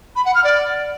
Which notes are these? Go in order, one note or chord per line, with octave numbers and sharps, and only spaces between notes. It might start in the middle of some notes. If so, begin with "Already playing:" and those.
B5
F#5
F6
D5